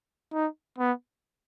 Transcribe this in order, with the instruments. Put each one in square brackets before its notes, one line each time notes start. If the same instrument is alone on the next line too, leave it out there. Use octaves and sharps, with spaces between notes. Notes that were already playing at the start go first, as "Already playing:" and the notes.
[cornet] D#4
B3